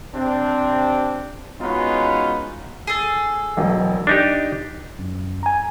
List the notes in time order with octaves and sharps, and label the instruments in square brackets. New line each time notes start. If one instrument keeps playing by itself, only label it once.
[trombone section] C3 C4 D4
G#3 B3 C#4 D#4 F4 F#4
[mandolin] G#4 A4
[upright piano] E1 B1
[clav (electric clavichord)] D4 D#4 G4
[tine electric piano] F#2
G#5 A#5